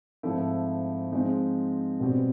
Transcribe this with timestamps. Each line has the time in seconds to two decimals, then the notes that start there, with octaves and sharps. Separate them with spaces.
0.23 G#2 F3 A3 C4 E4
1.12 F3 G#3 C4 D#4
2.00 B2 G3 C4